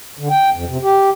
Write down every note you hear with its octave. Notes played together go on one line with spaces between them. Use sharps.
D3
G5
F2
C3
G4